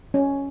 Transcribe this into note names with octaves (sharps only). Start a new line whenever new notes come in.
C#4